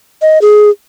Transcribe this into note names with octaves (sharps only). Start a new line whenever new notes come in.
D#5
G#4